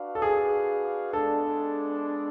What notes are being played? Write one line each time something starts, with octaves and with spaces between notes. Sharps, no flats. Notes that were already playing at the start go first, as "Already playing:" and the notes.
Already playing: D4 F#4 B4 D5 F5
A4
G#4
G#3 B3 D4 A4